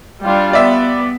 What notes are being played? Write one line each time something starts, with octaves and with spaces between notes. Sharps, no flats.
G3 D4 F4
B3 D5 E5